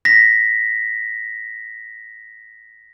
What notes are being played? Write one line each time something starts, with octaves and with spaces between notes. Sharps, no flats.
A#6 B6